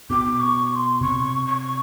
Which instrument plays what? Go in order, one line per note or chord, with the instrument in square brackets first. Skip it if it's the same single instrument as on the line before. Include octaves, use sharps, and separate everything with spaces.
[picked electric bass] B2 [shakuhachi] D6
[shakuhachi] C#6
C#6
C6
[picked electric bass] C3 [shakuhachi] C#6
[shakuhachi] C#6